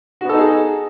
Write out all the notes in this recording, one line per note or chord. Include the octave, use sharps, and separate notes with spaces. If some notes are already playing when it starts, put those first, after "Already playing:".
B3 D#4 F#4 G#4 A4